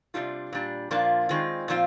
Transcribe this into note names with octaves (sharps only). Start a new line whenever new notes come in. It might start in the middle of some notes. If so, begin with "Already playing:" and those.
C3 D#3 G3 D4 F4
A#2 G3 D4
A#2 F3 A#3 D4 F4
D#3 G#3 C4 F4
A#2 F3 C4 F4